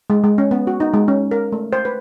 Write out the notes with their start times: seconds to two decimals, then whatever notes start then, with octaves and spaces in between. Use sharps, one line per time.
0.10 G#3
0.24 G#3
0.38 C#4
0.51 B3
0.67 F#4
0.80 D#4
0.94 G#3
1.08 C#4
1.31 A#4
1.52 A3
1.73 C5
1.85 B4